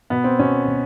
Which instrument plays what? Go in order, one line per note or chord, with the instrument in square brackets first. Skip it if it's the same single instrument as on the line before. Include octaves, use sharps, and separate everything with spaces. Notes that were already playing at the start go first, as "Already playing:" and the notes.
[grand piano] B2 B3
C4
B2 C#4
B2